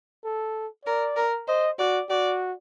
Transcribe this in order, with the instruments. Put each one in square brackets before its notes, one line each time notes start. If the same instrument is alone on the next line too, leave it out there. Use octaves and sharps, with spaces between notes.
[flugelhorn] A4
[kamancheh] A#4 [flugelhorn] D5
[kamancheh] A#4
[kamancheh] C5 [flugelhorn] D#5
[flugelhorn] F#4 [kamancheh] D5
[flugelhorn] F#4 [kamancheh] D5